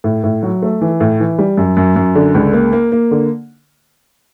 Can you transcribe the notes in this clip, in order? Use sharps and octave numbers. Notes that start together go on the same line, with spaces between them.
A2
A2
F#3
A3
E3
A2
E3
G3
F#2
F#2
F#2
D3
C#2
A#3
A#3
A#3
D3